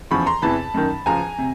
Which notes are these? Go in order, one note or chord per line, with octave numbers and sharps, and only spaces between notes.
E2 C#3 F3 B5 C#6
A#5 C6
E2 C3 E3 A5 B5
F#2 D#3
C#2 C#3 F3 G#5 A#5
C3